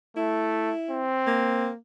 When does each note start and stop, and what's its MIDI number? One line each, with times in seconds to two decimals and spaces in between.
0.17 0.73 57
0.17 1.08 64
0.91 1.71 60
1.27 1.75 58